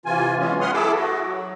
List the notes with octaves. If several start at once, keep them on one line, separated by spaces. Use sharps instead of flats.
C3 E3 F4 G#5
E3 F#3 G#3 B3 C#4 F4
B4 F#5 C6 D#6 F6
E4 G#4 A4 D6 E6
F#4
F#3